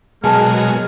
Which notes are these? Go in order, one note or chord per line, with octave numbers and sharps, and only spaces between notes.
B2 F#3 G#3 G#4 A#4 B4 G#5 A5